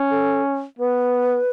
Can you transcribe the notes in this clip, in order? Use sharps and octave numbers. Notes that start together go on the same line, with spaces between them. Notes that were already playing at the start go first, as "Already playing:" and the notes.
Already playing: C#4
A4
B3 B4